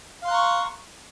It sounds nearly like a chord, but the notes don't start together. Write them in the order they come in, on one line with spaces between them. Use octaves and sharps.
F5 C6 F#6 A#5 C#6